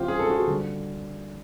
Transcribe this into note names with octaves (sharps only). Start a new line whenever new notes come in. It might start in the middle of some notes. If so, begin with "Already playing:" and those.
Already playing: C3 E3 G#3 C4 F4 G4
G#4
A4
F#4 G#4
D3 G3